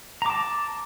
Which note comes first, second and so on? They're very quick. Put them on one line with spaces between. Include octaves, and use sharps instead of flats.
A#5 D6 A5